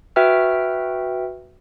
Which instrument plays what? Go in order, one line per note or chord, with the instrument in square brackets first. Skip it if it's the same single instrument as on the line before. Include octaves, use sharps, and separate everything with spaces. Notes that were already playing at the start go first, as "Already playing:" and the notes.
[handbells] F#4 B4 E5 G5 F6